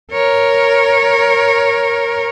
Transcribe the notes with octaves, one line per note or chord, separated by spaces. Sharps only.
A#4 C#5